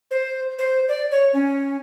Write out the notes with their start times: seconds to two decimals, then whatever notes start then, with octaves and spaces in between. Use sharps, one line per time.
0.11 C5
0.59 C5
0.88 D5
1.11 C#5
1.33 C#4